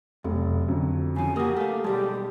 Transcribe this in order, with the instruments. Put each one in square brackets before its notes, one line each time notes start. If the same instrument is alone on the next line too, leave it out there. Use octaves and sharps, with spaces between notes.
[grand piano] F1 [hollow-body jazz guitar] B1
[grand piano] F2 D3 F#3
[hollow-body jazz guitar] C#3 F3 [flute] G#5
[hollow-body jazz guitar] A#3 F#4 [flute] G4 [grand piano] A#4 D#6
[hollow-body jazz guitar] A3 F5
[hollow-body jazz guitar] B2 G3 G#3 [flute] G4 [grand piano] A5